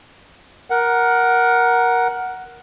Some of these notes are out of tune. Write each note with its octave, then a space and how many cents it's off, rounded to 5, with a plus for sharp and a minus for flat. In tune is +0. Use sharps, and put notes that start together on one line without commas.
A#4 +10 F#5 +5